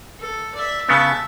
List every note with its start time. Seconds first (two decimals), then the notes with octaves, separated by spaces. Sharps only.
0.19 A4
0.54 D5 E5
0.89 C#3 B3 E5 A5